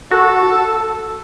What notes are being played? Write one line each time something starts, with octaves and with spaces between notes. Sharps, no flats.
F#4 A4